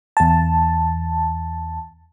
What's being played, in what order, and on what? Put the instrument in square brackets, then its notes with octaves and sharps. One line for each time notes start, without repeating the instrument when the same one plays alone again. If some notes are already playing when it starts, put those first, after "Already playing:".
[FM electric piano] E2 A5